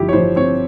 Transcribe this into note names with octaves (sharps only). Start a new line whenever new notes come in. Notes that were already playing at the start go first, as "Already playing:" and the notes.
Already playing: G1 F3 E4 G4
C#5
F3 C5
C4 C#5